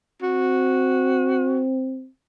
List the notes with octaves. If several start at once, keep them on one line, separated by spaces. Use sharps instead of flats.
C4 F#4